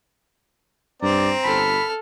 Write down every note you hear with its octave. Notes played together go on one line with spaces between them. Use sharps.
G2 C4 D5 A#5
G1 A4 B5 F6